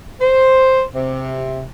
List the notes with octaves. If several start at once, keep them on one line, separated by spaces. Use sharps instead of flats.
C5
C3